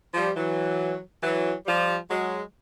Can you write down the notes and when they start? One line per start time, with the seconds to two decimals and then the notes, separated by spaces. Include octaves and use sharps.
0.14 F3 G3
0.37 E3 F#3
1.22 E3 F#3
1.66 F3 G3
2.09 F#3 G#3